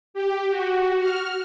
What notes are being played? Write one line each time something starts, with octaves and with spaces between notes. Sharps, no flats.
G4
F#4
F6